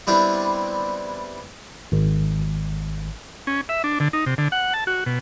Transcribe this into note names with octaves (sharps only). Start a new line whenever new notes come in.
G3 B3 C4 D4 E4
G#1
C#4
E5
D4
D3
D#4
C3
D3
F#5
A5
F#4
B2